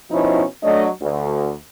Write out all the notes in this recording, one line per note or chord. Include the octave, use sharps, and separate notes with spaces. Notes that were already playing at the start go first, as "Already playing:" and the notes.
B2 F3 B3 C#4 D#4 E4
F#3 A3 D4 C#5 D#5
D2